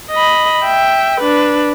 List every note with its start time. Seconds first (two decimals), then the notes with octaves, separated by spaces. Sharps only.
0.12 D#5 B5
0.64 E5 G5
1.21 D4 B4